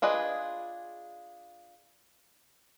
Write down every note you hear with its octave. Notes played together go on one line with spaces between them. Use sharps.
D4 F4 G#4 B4 D#5